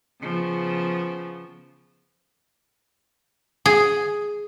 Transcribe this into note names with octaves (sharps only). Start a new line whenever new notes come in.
C#3 F3 B3
G#4